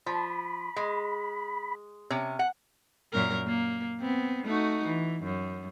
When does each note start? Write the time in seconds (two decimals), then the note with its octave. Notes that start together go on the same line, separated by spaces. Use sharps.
0.06 F3 B5
0.76 G#3
2.10 C3 C#4
2.39 F#5
3.13 F#2 A#2 A#4
3.47 A#3
4.00 B3 C4
4.45 A3 D#4 F#4
4.86 E3
5.24 F#2